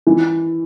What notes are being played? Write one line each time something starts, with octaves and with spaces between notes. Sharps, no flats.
E3